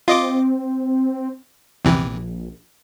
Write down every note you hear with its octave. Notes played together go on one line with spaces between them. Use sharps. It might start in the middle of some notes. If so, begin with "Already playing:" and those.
C4 F4 D#5 D6
A#1 E2 C3 E3